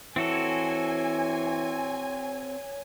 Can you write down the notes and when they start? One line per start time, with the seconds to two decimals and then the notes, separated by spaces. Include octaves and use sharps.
0.16 E3 C4 F#4 A4 C#5 G#5